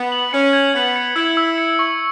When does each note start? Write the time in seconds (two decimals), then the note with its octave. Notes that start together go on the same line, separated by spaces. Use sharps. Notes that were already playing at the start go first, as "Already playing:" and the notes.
Already playing: B3
0.12 F#7
0.33 C#4 C#7
0.53 G#6
0.74 B3 F#7
0.96 C#7
1.16 E4 E6
1.37 E6
1.58 C#7
1.79 C#6